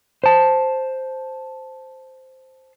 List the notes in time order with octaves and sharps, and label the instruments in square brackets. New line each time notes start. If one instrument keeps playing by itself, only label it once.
[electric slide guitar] C5 A5